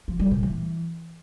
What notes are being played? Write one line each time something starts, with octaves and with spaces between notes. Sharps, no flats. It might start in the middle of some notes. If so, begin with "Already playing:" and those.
F3
G3
A#2
E3